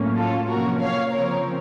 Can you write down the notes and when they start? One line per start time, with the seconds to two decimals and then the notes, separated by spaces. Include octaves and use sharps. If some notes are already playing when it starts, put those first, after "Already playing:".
Already playing: A2 F#3 A#3 C#4
0.17 F4 A4
0.49 C3 F3 A#3 C#4 F#4 A#4
0.80 C#5 F5
1.12 C#3 F3 C4 A#4 C#5